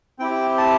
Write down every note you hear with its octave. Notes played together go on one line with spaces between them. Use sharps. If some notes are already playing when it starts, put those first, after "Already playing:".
C4 E4 G4 G5
A5